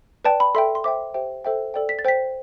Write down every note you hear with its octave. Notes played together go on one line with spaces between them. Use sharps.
B4 D5 G5 A5
B5
A4 E5 G5 C6
C6
C5 E5 G5 D6
G4 C5 E5 G5
A4 C5 E5 G5
A4 D5 G5
B6
A6
C5 G5 B6